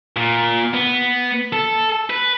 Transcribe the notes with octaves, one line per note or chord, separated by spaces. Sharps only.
A#2
B3
A4
B4